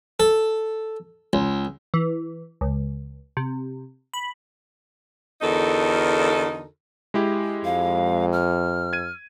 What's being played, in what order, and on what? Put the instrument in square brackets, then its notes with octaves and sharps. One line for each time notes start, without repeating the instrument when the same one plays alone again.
[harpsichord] A4
C#2
[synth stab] E3
C#2
C3
B5
[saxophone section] E2 D3 D#4 F#4 A4 A#4
[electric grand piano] G#3 E4 G4
[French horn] F2 [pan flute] F5
[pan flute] F6
[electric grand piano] G#6 D#7